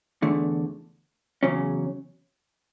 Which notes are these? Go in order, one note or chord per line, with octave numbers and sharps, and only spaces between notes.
E2 D3 A3
E2 C#3 F#3 C#4